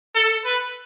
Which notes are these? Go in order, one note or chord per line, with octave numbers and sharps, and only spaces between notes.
A4
B4